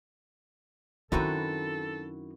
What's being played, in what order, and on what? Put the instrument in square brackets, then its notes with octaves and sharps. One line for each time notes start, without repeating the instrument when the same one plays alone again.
[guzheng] F#2 C4 B4 [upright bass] D#3 D#4 [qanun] E4 F#4 [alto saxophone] A4